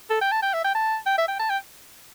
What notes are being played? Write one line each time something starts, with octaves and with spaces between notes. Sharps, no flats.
A4
G5
A5
G5
E5
G5
A5
G5
E5
G5
A5
G5